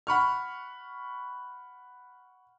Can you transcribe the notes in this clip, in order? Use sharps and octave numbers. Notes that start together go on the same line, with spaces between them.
F#5 B5 C#6 F6